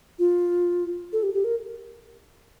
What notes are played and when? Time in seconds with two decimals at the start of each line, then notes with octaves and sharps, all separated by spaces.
0.19 F4
1.13 A4
1.23 G4
1.34 G4
1.44 A#4